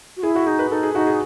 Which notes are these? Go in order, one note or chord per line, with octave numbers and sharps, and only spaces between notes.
F#4
E4 G#4
F#4
D#4 G#4
B4
D#4 A4
G#4
D#4 F#4
G#4